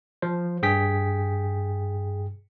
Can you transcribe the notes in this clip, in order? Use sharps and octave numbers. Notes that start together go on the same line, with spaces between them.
F3 C5
G2 G#4 G5 B6